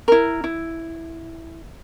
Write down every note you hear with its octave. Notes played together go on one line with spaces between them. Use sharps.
E4 A#4
E4